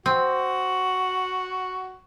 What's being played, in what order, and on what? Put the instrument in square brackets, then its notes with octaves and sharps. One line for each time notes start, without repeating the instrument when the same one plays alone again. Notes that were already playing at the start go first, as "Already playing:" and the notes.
[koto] C4 [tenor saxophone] F#4